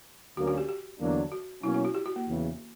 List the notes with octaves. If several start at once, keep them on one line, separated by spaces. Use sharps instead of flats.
D2 D3 F#3 A#3 C#4 F#4
F#4
G4
G4
E2 D3 F#3 A#3 D4
F#4
B2 F#3 A#3 C#4 E4
E4
F#4
G4
F#4
A#3
E2 C#3 E3